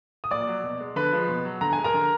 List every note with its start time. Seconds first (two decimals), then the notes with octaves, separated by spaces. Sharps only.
0.24 D#6
0.31 A#2 D5 D6
0.47 F#3
0.64 B2
0.80 G#3
0.96 D3 B4 B5
1.13 F3 G#3
1.29 B2
1.45 F#3
1.61 D3 A#5
1.73 G#3 G#5
1.84 A#4 A#5
1.94 D3